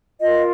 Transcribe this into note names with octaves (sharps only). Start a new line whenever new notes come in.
F4 A#4 D#5